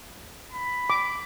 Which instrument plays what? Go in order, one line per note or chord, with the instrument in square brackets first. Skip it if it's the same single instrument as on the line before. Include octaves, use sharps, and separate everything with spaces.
[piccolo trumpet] B5
[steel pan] D6